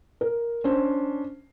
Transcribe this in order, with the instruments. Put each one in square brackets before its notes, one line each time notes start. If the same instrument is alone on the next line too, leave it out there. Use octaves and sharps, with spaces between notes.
[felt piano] A#4
C#4 D4 C5